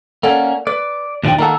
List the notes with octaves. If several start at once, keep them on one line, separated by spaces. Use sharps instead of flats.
A#3 C#4 A4 D5 F#5
B4 D5
D#2 A#2 F3 D4 D5 G5
D#3 A#3 A4 F#5 A#5